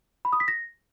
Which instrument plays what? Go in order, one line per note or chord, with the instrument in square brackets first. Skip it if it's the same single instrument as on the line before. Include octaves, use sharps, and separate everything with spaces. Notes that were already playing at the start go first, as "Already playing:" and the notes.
[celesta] B5
D#6
B6
A#6